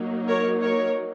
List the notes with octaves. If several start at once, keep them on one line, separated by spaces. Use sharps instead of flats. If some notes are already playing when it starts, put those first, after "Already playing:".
Already playing: F#3 A#3 D#4
A#4 C#5
A#4 C#5